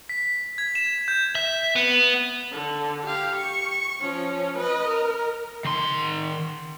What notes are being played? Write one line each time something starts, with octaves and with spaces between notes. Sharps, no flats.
B6
G#6
E7
G6
E5
B3
D3
G4 F5
C#6
F3 C#4
B4 D#5
A#4
D#3 C6